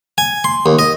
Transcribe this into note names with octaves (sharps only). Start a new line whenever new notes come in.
G#5
C6
D#2
D#5